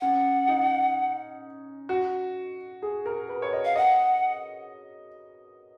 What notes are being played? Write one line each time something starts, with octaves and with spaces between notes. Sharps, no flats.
C#4 F#5
D#4
F#4
G#4
A#4
B4
C#5
D#5
F5
D#5 F#5